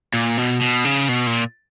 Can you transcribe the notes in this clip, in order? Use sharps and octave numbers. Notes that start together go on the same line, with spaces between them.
A#2
B2
B2
C#3
B2
A#2